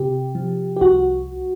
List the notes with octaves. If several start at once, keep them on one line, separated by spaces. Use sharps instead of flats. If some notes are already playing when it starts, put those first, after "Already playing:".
Already playing: C3 G4
F3
G4
C2 F#4